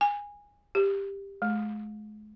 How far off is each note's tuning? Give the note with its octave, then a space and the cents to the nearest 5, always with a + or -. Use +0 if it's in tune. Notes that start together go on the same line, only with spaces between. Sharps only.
G#5 -20
G4 +15
G#3 +40